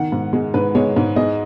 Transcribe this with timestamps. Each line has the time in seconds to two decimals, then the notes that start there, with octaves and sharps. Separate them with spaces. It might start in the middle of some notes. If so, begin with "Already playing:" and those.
Already playing: D#3 F#5
0.12 G#2
0.33 G#3
0.54 G#2 B4
0.75 G#3 C#5
0.96 G#2
1.16 G#3 D#5